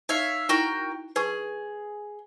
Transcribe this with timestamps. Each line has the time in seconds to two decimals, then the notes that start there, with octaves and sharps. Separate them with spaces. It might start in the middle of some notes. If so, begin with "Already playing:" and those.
0.09 D#4 C#5 E5 F5
0.49 D#4 E4 F#4 A#4 G5
1.16 G#4 B4 G#5 C#6